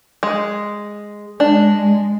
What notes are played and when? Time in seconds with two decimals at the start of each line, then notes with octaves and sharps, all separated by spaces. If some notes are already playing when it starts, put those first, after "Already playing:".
0.23 G#3
1.40 G#3 D4